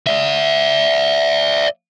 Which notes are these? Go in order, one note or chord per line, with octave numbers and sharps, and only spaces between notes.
D5 E5